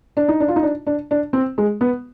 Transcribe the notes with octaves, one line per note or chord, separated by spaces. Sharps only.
D4
D#4
D4
F4
D#4
D4
D4
D4
C4
G#3
B3